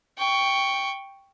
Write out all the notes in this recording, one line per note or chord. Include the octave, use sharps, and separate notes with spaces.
G5 C#6